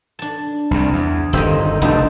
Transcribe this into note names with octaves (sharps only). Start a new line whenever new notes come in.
D4 A5
C2 C3
E2
G1 A#2 D#3 C4 G4 D#5
F1 B3 D4 D#4 C5